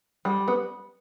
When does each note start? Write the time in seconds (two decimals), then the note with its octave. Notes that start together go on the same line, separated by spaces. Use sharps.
0.25 G3
0.48 B3